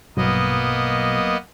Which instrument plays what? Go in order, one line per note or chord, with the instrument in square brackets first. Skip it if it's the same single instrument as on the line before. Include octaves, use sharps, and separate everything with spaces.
[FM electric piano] A#1 G2 F#3 [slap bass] B2 [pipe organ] A#3 B3 D#5